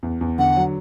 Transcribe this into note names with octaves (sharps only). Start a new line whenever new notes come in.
E2
E2
D3 F#5
F#3